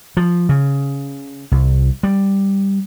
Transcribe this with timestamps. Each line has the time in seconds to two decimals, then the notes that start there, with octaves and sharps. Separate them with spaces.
0.17 F3
0.49 C#3
1.52 C2
2.03 G3